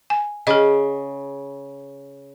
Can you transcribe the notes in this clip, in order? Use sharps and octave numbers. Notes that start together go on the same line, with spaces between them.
G#5
C#3 G#4 D#5